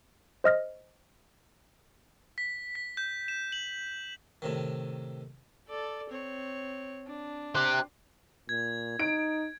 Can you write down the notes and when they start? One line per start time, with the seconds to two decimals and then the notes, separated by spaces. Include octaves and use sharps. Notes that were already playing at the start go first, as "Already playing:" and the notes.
0.44 C5 D#5 F6 A#6
2.38 B6
2.75 B6
2.97 G6
3.28 E7
3.52 F#7
4.42 A2 C3 D#3
5.68 A4 D5
6.10 C4 C#5
7.07 D4
7.55 G4 C5 F#6
8.49 A#2 G#6
8.99 D#4 D7